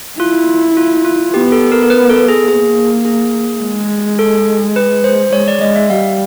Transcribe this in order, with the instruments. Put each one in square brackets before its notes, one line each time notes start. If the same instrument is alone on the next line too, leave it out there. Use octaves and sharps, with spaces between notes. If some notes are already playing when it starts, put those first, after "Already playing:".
[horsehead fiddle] E4 [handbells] F4
[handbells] F4
F4
[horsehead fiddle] B3 [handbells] G4
[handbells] A4
A#4
A#4
B4
A4
G#4
[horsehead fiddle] A#3 [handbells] G#4
[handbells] G#4
[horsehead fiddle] G#3
[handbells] A4
B4
C5
[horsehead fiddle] G#3 [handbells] C#5
[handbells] D5
[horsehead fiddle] G#3 [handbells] D#5
[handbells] E5
[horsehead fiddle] G3 [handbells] F5